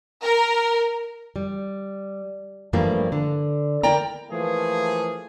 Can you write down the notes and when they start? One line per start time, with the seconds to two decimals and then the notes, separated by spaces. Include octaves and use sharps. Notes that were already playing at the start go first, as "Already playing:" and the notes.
0.22 A#4
1.36 G3
2.73 G2 E3 F3 G3 A3 A#3
3.12 D3
3.83 E4 A#4 D5 G5 A#5
4.31 E3 F3 A3 A#3 G#4